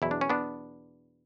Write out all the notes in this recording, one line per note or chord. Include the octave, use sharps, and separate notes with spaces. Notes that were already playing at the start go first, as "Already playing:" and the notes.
E2 B2 F#3 E4
D4
C#4
B3 D4